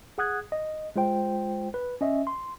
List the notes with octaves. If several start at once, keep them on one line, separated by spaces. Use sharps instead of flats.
G#4 F#5 D#6 F#6 G#6
D#5
G#3 F4 C5 G5
B4
C#4 D#5 E5
C6